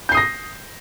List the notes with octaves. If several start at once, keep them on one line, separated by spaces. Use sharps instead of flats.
D#6 G6 A#6 C7